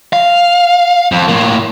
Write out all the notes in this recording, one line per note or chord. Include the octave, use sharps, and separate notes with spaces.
F5
F2
A2 A#3